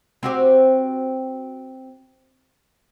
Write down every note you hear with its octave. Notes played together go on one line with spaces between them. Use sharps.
C4 F#4 G4